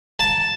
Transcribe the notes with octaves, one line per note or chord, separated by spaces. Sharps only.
A5